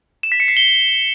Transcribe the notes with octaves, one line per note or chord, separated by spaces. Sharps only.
E7
B6
C#7
C7
G7